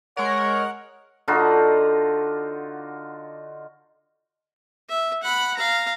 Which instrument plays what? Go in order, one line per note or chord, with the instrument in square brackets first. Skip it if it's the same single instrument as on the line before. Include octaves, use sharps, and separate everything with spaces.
[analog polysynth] G#3 A#4 [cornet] C#5 [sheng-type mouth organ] F#5
[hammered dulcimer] D3 D#4 F4 F#4
[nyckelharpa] E5
F#5 B5
F5 A#5